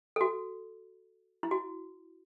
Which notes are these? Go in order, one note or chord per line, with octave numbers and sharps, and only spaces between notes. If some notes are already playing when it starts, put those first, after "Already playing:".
A4
F#4
E4
F#4